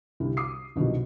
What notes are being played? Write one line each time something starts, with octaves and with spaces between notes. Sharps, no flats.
C2 D3
D6 D#6 C7
C2 B2 D3 D#3 F3 F#3